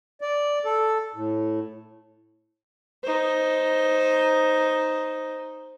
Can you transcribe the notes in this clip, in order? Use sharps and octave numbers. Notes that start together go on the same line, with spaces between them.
D5
A4
A2
D#4 C5